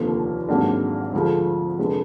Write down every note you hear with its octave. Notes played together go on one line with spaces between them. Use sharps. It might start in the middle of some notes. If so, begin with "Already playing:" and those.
Already playing: F1 D#2 D3 F3 A#3
G#1 G#2 F#3 A#3 D4
D2 D3 F3 G#3
F1 D3 G#3